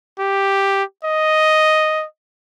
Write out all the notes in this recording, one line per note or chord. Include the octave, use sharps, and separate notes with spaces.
G4
D#5